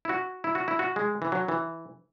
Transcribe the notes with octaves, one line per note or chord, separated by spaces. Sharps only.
E4
F#4
E4
F#4
E4
F#4
G#3
E3
F#3
E3